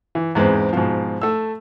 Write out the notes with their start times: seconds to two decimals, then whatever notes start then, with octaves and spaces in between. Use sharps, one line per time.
0.15 E3
0.35 E2 G#2 G#3 B3 C4
0.73 G#2 B2 F3
1.22 A3 E6